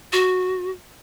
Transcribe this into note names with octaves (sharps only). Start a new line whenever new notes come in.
F#4